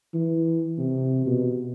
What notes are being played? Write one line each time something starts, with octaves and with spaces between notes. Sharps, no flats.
E3
C3
B2